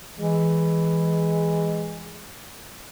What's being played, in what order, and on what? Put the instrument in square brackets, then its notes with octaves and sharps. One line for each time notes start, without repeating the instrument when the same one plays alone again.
[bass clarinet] E3 [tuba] G#3